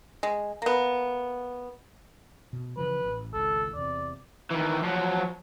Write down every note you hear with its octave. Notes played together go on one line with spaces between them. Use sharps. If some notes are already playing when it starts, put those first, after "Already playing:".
G#3
A#3 B3
B2
C#3 E3 F3 B4
A1
G#1 C#2 A4
E2 C3 D5
D#3 E3
F3 F#3